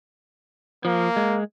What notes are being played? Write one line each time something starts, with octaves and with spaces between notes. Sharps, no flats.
F3 A#3
G#3